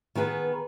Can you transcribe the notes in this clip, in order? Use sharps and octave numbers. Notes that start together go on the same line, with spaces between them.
D#3 B3 G#4 B4